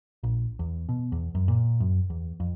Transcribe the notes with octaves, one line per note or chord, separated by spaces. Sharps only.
A#1
E2
B2
E2
F#2
A#2
F#2
E2
F2